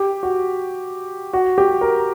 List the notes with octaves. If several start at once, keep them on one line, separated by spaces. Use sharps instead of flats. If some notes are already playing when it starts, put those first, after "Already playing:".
Already playing: G4
F#4
F#4
G4
A#4